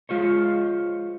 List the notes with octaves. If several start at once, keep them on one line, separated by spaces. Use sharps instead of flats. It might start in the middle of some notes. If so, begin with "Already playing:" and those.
G#3 F4 C5 C#5